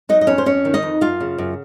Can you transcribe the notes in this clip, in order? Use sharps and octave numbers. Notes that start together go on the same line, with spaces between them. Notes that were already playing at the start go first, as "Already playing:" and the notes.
F#3 D#4 D#5
D#5
F2 C#4 C#5
C5
F2 C#4 C#5
D#3
D#4 D#5
F2
F#2 F4 F5
C#3
F#2